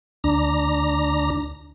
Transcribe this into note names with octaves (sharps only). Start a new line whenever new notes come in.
D2 D4 A#5